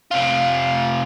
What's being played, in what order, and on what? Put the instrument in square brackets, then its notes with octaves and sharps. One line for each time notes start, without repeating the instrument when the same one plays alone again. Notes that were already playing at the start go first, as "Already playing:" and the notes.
[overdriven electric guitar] C3 F4